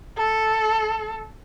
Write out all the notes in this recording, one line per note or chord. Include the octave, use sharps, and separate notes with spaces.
A4